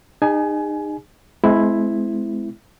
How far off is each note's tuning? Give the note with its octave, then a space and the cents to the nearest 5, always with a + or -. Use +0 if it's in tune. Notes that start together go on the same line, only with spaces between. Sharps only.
D#4 -30 G#4 -40 G#5 +25
G#3 +30 C4 -35 E4 +5